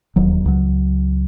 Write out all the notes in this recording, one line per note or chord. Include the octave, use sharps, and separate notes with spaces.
D1 D#2 F#3
C#2 F#3